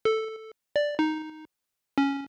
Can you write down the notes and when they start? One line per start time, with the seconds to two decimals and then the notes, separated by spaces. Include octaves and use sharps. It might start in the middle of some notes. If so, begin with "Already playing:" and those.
0.05 A4
0.76 D5
0.99 D#4
1.98 C#4